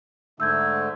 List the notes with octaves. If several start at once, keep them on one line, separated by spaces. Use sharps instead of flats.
G#2 D3 A3 E6 G6 G#6